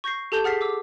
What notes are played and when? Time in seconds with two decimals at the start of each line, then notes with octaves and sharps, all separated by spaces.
0.04 C#6 G6 A#6 C7
0.32 G4 A4 A5 G6 G7
0.44 G#4 F#5 F6 A6 B6 C7
0.61 D6 E6